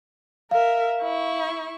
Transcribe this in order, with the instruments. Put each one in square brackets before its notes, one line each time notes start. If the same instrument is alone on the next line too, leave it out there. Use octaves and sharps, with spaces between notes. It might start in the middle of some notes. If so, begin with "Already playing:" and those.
[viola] A#4 E5 [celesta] F5
[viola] E4 C#6